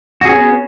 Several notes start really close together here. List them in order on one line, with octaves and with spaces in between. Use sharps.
F#4 G#4 C#4 B3